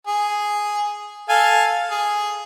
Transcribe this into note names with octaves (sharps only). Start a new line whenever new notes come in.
G#4
A4 F5 G#5
G#4